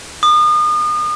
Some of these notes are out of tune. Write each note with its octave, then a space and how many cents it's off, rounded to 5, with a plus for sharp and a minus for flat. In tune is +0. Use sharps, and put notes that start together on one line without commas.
D#6 -35